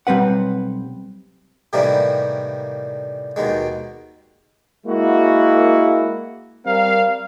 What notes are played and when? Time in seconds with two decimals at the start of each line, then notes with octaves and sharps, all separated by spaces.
0.07 B1 G3 C4 B4 F#5
1.73 A2 C3 D#3 E3 G3 A#3
3.36 D#2 B2 D#3 G#3
4.87 G#3 A#3 E4 F#4
6.66 G3 C4 A#4 F5